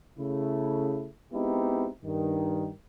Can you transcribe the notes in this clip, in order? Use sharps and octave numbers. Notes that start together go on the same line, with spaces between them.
C#3 A3 E4
G#3 B3 C4 D#4 E4 G4
G2 D#3